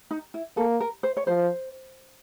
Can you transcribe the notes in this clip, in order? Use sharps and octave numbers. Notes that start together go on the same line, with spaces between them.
D#4
E4
A#3 A4
A#4
C5
C#5
F3 C5